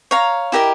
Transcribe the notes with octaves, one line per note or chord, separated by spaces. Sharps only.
C#5 F5 A#5
E4 G4 A#4 D#5